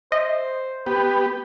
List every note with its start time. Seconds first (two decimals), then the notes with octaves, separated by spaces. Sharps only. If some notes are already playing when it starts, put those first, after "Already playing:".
0.12 C5 D#5 E5
0.86 B3 G4 B4